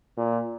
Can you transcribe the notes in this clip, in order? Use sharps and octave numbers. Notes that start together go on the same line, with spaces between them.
A#2